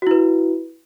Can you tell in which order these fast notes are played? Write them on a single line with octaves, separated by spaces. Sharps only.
F#4 E4 B4